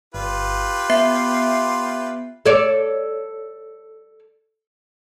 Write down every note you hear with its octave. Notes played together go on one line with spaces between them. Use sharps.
G1 F4 G4 B4
B3 E5 C7
A4 C#5 D5